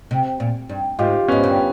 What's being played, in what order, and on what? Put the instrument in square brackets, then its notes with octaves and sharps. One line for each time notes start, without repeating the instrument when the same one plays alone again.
[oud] C3
A#2
G2
[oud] G#2 [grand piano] F4 G4
[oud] G#2 [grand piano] B3 C#4
[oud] G2